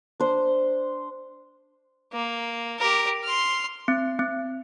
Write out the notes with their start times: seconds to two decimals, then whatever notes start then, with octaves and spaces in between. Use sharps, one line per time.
0.20 D4 C5
2.13 A#3
2.79 G4 A#4
3.24 C6 F6
3.88 C4
4.19 C4